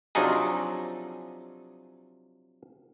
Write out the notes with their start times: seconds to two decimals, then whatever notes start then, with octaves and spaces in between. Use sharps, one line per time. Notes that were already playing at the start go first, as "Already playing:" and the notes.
0.15 C3 F3 F#3 D4 D#4 G#4